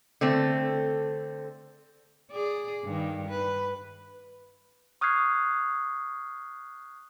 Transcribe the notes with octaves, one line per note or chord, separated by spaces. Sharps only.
D3 A3 C4
G#4 D5
G2 D#3
B4
C#6 D#6 F6 F#6 G#6 C7